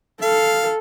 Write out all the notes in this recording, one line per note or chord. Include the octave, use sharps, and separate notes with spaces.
A4 F5